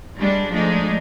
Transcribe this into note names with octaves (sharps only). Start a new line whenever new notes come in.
G3 G#3 D4
F3 G#3 A3 D4 D#4